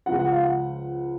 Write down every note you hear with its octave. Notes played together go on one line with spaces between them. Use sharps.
C#2 C#3 F3 F#5
F#5
F5
F#5